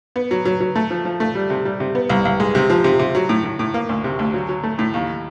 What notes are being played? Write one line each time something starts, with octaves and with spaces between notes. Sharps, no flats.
B3
F#3
F#3
F#3
A3
F3
F3
A3
G3
C3
G3
C3
B3
C2
C2
G#3
C3
F3
C3
C3
F#3
A2
A2
A2
A#3
D2
C3
D2
F#3
F#3
A3
A2
D#2